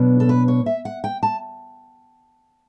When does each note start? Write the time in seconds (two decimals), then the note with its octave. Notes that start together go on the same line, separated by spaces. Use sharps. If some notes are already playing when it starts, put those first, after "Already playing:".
Already playing: B2 F#3 B3 D4
0.20 A4
0.29 B4
0.48 C#5
0.66 E5
0.85 F#5
1.04 G5
1.23 A5